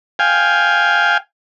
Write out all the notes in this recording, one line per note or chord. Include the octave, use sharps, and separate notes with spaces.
F5 G5 G#5